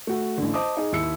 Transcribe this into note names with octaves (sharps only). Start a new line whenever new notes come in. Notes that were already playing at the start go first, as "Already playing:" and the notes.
A3 F#4
A1 D3
C5 D#5 A5 D6 D#6
D#4 G#4
D#2 E4 E6 C#7